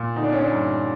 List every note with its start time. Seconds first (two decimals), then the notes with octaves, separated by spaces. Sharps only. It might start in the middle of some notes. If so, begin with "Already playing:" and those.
Already playing: A#2
0.16 D3 D#4
0.24 D4
0.32 C#4
0.41 D4
0.52 G2